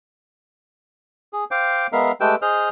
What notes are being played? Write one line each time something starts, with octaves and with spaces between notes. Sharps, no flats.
G#4
C5 F5 G5 D6
G#3 B3 A#4 E5 F5
G#3 A3 G4 B4 G5 E6
G#4 C5 D#5 F6